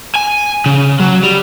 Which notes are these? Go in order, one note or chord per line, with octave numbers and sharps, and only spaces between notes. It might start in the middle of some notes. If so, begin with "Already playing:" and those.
G#5
C#3
F#3
G3